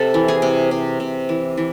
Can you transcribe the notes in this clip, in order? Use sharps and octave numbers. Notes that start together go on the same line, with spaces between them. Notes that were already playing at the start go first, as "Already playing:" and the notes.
Already playing: C3 A4
E3
G#4
C3
C3
C3
E3
E3